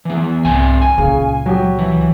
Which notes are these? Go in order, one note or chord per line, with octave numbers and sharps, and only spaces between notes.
E3 B3
C2 G#2 C3 G#5
G#5
C#2 A#2 C#3
F#3 G4
E3